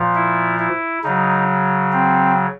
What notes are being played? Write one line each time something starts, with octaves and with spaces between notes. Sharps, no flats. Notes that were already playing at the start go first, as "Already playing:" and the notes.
Already playing: A#2 F3
E4
E4
C#3 F#3 D#4
C4